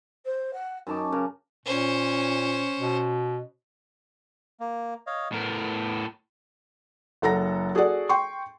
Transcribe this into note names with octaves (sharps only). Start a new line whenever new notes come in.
C5
F#5
F#2 D#4 A5 D6
C#3 A#4
A#2 C#4 C5
B2
A#3
C#5 D#5 F5
A2 B3 A#4
F#1 A4 F#5 A#5 A#6
F#4 G#4 A4 D5 F#5
G5 C6 C#6